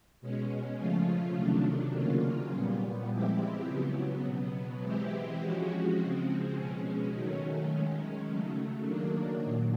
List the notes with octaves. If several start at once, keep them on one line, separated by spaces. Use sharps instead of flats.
B2 G#3 C#4
C#3 F3 A3 C#4 F4
C3 D#3 F#3 A3 D4
C#3 F#3 A#3 C#4 F4
A#2 G3 B3
F3 G#3 C4 E4 G4
C#3 F#3 B3
B2 F#3 B3
E3 G#3 C4 E4 G4
F3 G#3 C#4 F#4
C#3 F3 G#3 C4
B2 G#3 C#4
D#3 F#3 A3 C#4
D#3 G#3 C#4
C#3 F#3 A3
D#3 F#3 A#3 D4
A#2 F#3